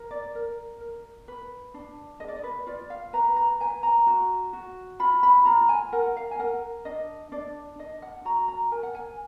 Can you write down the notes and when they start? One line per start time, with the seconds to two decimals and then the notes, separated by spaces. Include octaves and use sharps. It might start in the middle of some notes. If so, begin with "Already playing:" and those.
Already playing: A#4
0.11 D5
0.35 A#4
0.81 A#4
1.28 B4
1.74 D4
2.20 G#4 D#5
2.28 D5
2.36 D#5
2.44 B4
2.67 F4 D5
2.90 F5
3.13 B4 A#5
3.36 A#5
3.60 B4 G#5
3.83 A#5
4.07 F#4
4.53 F#4
5.00 F4 B5
5.23 B5
5.46 F4 A#5
5.69 G#5
5.92 A#4 F#5
6.17 F5
6.31 G#5
6.39 A#4 F#5
6.85 D4 D#5
7.32 D4 D5
7.79 D4 D#5
8.02 F#5
8.25 F#4 A#5
8.48 A#5
8.71 A#4 G#5
8.83 F#5
8.95 G#5